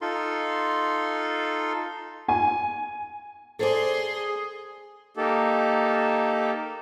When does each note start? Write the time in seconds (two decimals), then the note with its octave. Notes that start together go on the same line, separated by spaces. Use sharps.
0.02 D#4 F4 A4 C6
2.28 G#5
3.59 G#4 A4 C5 D5 C6
4.15 G#4
5.17 A#3 D#4 G4 A4